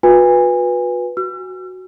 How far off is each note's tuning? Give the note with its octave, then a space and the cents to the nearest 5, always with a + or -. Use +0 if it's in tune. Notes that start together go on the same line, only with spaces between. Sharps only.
F#4 -45 B4 -10 G#5 -25
F#4 +0 E6 +45